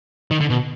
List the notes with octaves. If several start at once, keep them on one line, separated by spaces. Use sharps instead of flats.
D#3
D3
B2